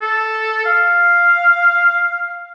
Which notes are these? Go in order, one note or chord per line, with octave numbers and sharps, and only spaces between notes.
A4
F5